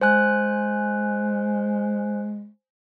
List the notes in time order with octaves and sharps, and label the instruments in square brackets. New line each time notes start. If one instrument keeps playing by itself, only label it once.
[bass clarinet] G#3 [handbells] C5 G#5 F#6